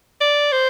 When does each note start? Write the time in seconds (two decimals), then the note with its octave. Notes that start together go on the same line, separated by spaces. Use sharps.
0.21 D5
0.52 C5